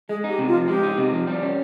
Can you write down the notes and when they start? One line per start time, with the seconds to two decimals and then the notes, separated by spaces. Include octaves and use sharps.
0.09 G#3 G#4
0.24 D#4 G4
0.39 C3
0.48 F4
0.54 F3
0.68 G#3 G4
0.83 D#4
0.97 C3
1.13 F3
1.27 G3
1.42 C#4